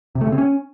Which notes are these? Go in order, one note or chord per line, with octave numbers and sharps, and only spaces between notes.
C3
A3
C#3
C4
C#4